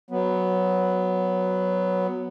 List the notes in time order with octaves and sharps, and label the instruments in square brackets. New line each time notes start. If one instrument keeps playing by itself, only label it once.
[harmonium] F#3 B3